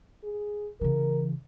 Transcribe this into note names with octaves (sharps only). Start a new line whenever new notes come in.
G#4
C#3 E3 A#4